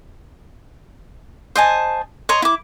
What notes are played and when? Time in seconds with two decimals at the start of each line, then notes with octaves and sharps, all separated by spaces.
1.56 C5 D#5 G#5 A5
2.29 C#5 D#5 A#5 C6
2.42 E4 D6